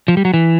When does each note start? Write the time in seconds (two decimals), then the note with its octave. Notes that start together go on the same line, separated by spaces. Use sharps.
0.08 F3
0.17 G3
0.25 F#3
0.34 E3